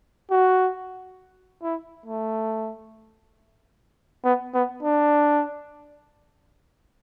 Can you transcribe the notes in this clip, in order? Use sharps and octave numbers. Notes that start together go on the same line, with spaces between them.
F#4
E4
A3
B3
B3
D4